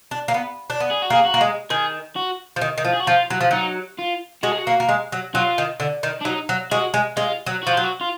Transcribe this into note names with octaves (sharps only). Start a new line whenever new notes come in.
D4
A#3
B3
D4
B3
G#4
F#4
A#3 G#4
F#4
A#3
G#3
D#3 G#4
F#4
F3
D#3
D#3
F3
G#4
F#4
F3 F4
F#3
F3
F#3 D#4
F4
G#3 F#4
G#4
F#4
A#3
A#3
G#3
F#3
F#3 F4
D#3
D3
D#3
D4
F#3 D#4
F#3
G#3 F#4
G#3
G#3 F4
F#3
F3 F#4
F#3 F4
F#4
F4